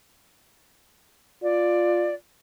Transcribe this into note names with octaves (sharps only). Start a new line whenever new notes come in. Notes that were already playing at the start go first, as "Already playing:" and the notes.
F4 D5